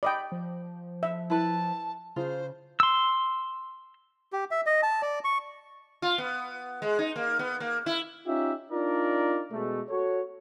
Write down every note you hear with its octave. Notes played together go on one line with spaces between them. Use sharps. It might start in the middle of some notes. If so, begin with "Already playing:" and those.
D5 D#5 G5 B5
F3
E5
E4 B4 A5
C#3 F4 C5
C6 E6
G4
E5
D#5
A5
D5
C#6
F4
B3
G#3
D#4
A#3
B3
A#3
E4
C#4 D#4 F4 G4 E5
D4 D#4 F4 A#4 D5
B2 G#3 A3
F#4 A4 C#5